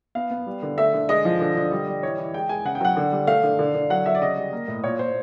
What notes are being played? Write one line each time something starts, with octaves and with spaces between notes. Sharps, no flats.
B3 F5
B3
G3
D3
A3 E5
D3
G#3 D#5
F3
D3
D3
G3
G3
E3 C#5
E3
G#3 G5
G#3 G#5
C#3 F#5
G5
F#3 F#5
D3
G3
A3 F5
D3
D3
D3
F#3 F#5
F#3 E5
D5
C#3 D#5
G3
A#3
A2
A#2 C#5
A#2 C5